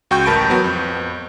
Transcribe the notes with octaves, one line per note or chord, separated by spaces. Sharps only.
C#2 F#4 G5 C#6 G6
A1 A#4 A5 B5 C#6 D7
F#3 B3 F#4
F2